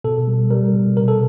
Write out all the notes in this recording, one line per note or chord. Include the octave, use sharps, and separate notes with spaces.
B2 A4
G3
G3 A#4
B2
C3 A#4
A4